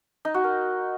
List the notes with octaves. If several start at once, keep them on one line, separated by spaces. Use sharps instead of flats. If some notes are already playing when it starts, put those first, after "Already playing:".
D#4
F#4
A#4